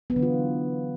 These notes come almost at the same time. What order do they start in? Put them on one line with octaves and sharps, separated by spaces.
B3 F#3 D3 E3 F4